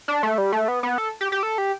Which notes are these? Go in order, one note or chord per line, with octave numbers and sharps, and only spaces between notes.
D4
A3
G3
A3
B3
B3
A4
G4
G4
A4
G4